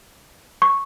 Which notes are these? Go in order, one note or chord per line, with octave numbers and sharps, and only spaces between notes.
C#6